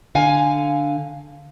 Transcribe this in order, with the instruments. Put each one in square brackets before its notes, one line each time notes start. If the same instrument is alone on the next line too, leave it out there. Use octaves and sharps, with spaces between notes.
[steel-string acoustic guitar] D3 F5 G#5